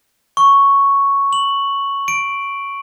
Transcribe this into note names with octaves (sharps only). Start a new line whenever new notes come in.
C#6
F#7
D7